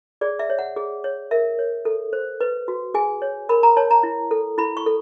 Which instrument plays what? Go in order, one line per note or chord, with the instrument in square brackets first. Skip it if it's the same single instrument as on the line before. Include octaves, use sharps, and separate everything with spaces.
[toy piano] G#4 D5
E5
C#5
F#5
G#4
C#5
A#4 E5
C#5
A4
C5
B4
F#4
G#4 G#5
C#5
A#4 B5
A#5
C#5 A5
A#5
E4
A4
E4 B5
C#6
A4